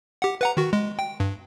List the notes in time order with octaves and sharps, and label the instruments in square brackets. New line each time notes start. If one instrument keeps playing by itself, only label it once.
[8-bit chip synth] G4 F#5
B4 F#5 A#5
D#3 F#4
G#3
G5
G2